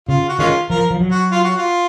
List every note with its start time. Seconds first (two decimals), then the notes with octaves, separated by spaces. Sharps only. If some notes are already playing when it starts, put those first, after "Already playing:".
0.09 C#3 F4
0.28 F#4
0.39 D#3 G#3 C#4 F4
0.70 F3 A#4
0.91 F3
1.01 F#3
1.11 F#4
1.31 F4
1.44 F#4
1.57 F4